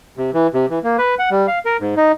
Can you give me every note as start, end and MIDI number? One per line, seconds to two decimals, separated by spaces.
0.17 0.30 48
0.34 0.47 52
0.54 0.66 48
0.70 0.79 52
0.84 0.97 58
0.98 1.15 71
1.19 1.30 78
1.31 1.47 55
1.48 1.59 77
1.65 1.77 70
1.80 1.95 44
1.97 2.12 63